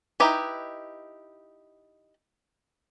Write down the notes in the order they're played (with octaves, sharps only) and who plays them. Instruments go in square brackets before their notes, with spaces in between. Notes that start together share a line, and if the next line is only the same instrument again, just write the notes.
[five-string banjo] D#4 E4 G4 B4